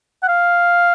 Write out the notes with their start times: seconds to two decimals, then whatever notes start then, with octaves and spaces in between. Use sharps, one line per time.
0.23 F#5
0.28 F5